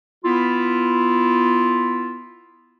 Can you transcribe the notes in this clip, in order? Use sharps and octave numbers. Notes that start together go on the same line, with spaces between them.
B3 E4 F4